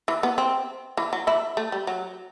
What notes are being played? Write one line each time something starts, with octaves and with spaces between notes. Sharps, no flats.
E3
B3
C4
E3
F#3
E3 E4
A3
G3
F#3